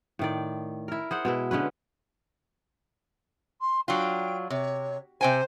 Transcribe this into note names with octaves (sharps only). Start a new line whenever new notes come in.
A2 D#3 D5
E4 A#4
G#4 C5 F#5
B2 G#3 E4
D3 G#3 C#4 B4
C6
F#3 D4 F4 G5
C3 C#5
C3 C5 G5 G#5